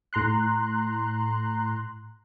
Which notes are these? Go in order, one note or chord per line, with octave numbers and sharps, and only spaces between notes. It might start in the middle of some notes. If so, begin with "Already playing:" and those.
A2 A#5 C6 F#6